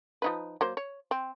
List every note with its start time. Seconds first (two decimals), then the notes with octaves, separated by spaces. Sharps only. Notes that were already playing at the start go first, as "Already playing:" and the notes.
0.22 F3 D#4 B4
0.61 F#3 A#3 C5
0.77 C#5
1.11 C4